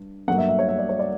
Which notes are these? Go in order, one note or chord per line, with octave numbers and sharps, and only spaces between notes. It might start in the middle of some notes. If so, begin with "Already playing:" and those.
Already playing: G2
G2 F#3 A#3 F#5
E5
E5
C#5
E5
D5
C#5
D5